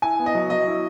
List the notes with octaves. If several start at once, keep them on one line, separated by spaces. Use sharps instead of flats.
E4 G#5
B3
D#5
F#3
F#3 D#5
E4